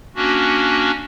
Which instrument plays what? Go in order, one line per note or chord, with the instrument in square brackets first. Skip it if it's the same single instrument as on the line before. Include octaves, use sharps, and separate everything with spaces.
[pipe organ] A#3 C#4 D4 F#4